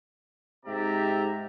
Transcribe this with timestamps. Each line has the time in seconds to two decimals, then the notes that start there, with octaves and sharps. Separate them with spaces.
0.66 G#2 C3 G4 D5 E5 A#5